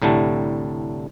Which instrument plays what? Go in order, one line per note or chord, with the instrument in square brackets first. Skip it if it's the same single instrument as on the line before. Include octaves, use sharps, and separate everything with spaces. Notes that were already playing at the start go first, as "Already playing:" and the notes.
[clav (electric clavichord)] C2 A2 D3 G3 A3